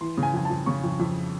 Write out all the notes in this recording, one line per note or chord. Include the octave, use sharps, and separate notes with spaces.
E3 C6
C#3
G#5
F2 G#5
A5
F2
C#3 C#6
F2
F2